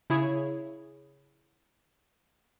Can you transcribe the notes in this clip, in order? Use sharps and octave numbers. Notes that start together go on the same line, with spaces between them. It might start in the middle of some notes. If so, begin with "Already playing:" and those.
C#3 E4 G#4 C#5